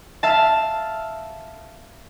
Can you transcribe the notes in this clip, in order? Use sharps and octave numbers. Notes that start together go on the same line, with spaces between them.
E5 F5 A5